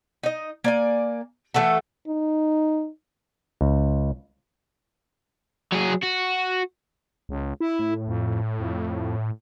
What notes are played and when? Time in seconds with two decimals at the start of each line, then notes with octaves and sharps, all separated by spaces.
0.23 D#4 D#5
0.64 A#3 D5 G#5
1.54 E3 A3 F#4 A4
2.08 D#4
3.61 C#2
5.72 F#3 G#4
6.02 F#4
7.29 C#2
7.60 E4
7.79 A2
8.08 F2
8.59 F2